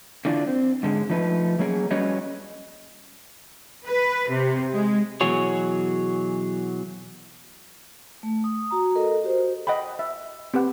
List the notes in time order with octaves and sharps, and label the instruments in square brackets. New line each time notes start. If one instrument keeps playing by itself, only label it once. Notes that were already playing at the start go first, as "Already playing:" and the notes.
[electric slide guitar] D3 E3 A#3 D4 F4
C4
G#2 D3 G#3
F3 A3 D#4 B4
F#3 A#3 C#4 G#4 A#4
G3 C#4 F#4 B4 C#5 D#5
[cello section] B4
C3
G#3
[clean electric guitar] B2 E3 F#3 F#4 G#4 C#5
[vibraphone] A3
D#6
F#4 A#5
A4 A#4 D#5
F#4 G4 C5
[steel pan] D#5 F#5 G5 B5
E5
C4 G4 B4 F#5